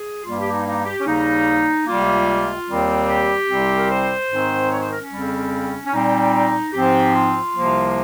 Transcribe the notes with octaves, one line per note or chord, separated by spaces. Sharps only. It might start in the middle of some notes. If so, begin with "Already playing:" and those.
Already playing: G#4
G2 G3 A#3 F4
G4
D#4
D#4
G4
C#4
D#2 C#3 G3 A#3 D#4
C#2 C3 G3 A#3 F4
D#2 D#3 G3 C4
G4
C2 C3 G3 C4
A#4
C5
G#2 D#3 G#3 C4
C#5
C5
A#4
C#4
F2 C#3 G3 C4
C#4
A#2 G3 C4 D#4
G#2 F3 C4 G4
F4
C2 C3 F3 A#3